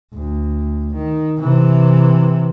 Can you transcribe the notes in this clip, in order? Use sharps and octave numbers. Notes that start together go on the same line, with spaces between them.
D2
D#3
C3 E3